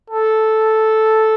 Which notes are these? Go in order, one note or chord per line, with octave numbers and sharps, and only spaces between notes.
A4